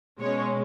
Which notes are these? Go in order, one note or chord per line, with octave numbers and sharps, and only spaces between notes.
B2 G#3 C#4 C#5